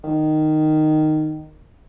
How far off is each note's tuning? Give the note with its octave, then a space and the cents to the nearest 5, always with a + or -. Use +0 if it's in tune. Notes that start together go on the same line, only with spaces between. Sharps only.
D#3 -10